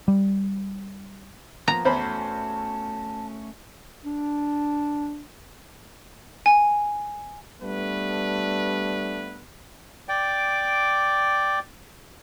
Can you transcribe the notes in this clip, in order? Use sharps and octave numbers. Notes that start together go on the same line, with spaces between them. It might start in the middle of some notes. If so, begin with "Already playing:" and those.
G3
F3 A#3 B3 A#5
E2 A3 C#4 F#4 C5 A5 B5
D4
G#5
G3 A3 B3 D4 B4
D5 G5 D6